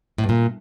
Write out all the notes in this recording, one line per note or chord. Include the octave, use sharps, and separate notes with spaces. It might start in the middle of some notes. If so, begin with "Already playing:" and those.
A2
G2
A#2